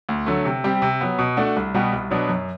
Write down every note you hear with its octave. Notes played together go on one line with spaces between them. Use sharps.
D2
D3 F#3 A3
C3
G3 C4 G4
C3
F#3 B3
B2
A3 D4 F#4
C2
B2 G3 B3 F#4
C2
B2 F#3 B3 D4
F#2